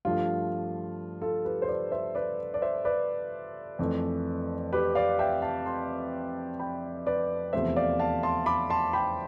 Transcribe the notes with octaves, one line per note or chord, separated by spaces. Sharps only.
G2 F3 A3 F4
F4 A4
G4 B4
C5
B4 D5
C5 E5
B4 D5
D5
C5 E5
B4 D5
F2 E3 A3
G4 B4
D5 F5
E5 G5
F5 A5
A5 C6
G5 B5
B4 D5
E2 C3 F3 A3 C5 E5
D5 F5
F5 A5
A5 C6
B5 D6
A5 C6
G5 B5